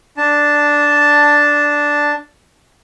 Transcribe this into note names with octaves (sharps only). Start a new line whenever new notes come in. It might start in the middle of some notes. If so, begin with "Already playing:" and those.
D4 A5